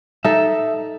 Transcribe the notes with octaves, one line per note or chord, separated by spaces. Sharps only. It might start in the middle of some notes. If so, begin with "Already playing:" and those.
D#4 A4 E5